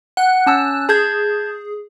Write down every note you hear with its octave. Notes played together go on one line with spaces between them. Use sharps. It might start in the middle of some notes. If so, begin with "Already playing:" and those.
F#5 F#6
C#4 A5 E6
G#4 A5 G6 G#6